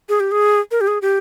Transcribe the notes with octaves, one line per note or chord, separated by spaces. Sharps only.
G#4
G4
G#4
A#4
G4
G#4
G4